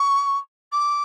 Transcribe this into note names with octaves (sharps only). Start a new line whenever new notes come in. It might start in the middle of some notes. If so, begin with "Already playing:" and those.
Already playing: C#6
D6